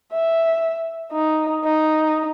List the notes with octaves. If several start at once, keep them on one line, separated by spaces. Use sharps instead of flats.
E5
D#4
D#4